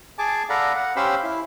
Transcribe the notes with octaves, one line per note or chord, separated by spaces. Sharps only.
G#4 G#5 A5 D6
A4 D5 F5 F#5 A#5 B5
F#5
C#4 G4 C5 F5 B5 E6
E4